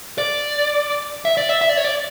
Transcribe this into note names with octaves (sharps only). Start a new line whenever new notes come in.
D5
E5
D5
E5
E5
D5
C#5
D5